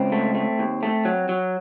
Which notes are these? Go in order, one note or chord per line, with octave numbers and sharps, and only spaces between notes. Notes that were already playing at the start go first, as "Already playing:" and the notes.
Already playing: C#2 C4
A3
A3
D#2
A3
F#3
F#3